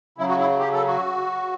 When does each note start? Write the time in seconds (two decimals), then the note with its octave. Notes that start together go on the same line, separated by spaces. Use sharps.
0.18 C#3 F#3 E4
0.28 F#4
0.39 E4
0.59 G4
0.73 A4
0.87 F#4